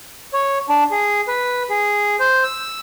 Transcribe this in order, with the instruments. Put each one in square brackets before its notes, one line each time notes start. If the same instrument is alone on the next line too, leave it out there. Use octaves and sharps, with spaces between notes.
[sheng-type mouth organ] C#5
D4
G#4
B4
G#4
C5
E6